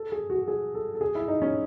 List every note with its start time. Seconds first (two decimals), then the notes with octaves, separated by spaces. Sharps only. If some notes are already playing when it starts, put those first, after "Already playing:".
Already playing: A4
0.12 G#4
0.30 F#4
0.48 G#4
0.75 A4
0.95 A4
1.01 G#4
1.15 E4
1.28 D#4
1.42 C#4